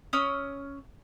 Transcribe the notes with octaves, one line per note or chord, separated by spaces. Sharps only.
C#4 D#6 E6